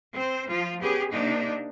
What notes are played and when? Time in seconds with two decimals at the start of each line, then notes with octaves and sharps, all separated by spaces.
0.13 C4 C5
0.48 F3 F4
0.81 B3 C#4 G4 G#4
1.12 C3 A#3 D4 D#4